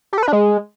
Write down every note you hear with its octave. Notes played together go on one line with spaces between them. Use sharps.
G4
A4
B4
D4
G#3